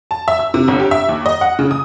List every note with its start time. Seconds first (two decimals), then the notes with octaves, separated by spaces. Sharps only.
0.11 A5
0.28 E5
0.39 E6
0.54 C3
0.68 G1
0.80 G4
0.91 E5
1.09 D#2
1.26 D#5
1.41 F#5
1.59 C#3
1.71 D#6